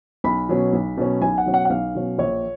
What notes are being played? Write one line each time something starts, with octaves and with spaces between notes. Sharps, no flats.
B1 B5
B2 F#3 C#4
B1
B2 F#3 C#4
B1 G#5
F#5
B2 F#3 C#4
F#5
F#5
B1 F5
B2 F#3 C#4
A#1 C#5